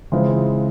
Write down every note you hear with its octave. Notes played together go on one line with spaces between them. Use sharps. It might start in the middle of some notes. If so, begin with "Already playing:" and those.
C#3 E3 G#3 C4 F4